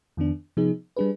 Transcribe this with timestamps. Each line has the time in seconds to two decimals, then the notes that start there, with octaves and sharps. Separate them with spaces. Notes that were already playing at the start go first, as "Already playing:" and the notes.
0.17 F2 D#3 B3 D4
0.57 C3 F3 B3 D#4 G#4
0.97 G3 D4 G#4 B4